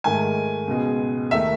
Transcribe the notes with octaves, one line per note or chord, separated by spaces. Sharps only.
G#2 D#3 A3 G#5
C#2 B2 G#3
D#2 D#3 A3 E5